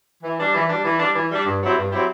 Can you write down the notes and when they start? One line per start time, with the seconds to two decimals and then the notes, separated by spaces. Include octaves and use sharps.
0.24 E3
0.39 G3 D4
0.54 E3
0.69 G3 D4
0.85 E3
0.99 G3 D4
1.15 E3
1.31 G3 D4
1.45 G2
1.61 F#3 C4 E4 G4
1.76 G2
1.92 F#3 C4 E4 G4